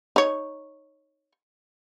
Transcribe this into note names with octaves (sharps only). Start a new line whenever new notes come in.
D#4 C#5